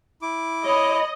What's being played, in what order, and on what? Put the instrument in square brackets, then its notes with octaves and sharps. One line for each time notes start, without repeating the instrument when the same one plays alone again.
[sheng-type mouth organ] E4 D6
[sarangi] C#5 [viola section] D#5 [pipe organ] B5